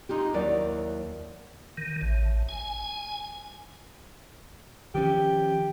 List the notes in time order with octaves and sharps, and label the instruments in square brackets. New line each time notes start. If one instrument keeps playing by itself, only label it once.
[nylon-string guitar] G#3 D#4 F4 G4
D#2 F#3 E4 D5
[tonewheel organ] D#3
A1
G#5
[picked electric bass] D#3 F3 C#4 [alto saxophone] G4